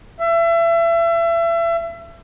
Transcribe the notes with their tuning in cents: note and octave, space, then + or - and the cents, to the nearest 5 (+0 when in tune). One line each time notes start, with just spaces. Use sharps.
E5 +30